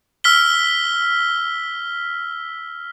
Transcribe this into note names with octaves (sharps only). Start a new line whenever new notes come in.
E6 F6 B6 G7